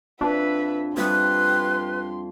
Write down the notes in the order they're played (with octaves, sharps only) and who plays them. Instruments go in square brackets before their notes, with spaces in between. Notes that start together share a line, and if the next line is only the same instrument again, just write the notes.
[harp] F2 [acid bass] D4 [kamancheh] B4 E5
[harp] F2 G3 E5 [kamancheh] G4 C6 [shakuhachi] B4